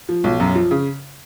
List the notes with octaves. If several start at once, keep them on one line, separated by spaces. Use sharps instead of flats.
F3
B1
F#2
F3
C#3